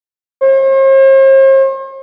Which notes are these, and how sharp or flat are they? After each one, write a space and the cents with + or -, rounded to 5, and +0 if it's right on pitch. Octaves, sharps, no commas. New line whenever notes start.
C5 +45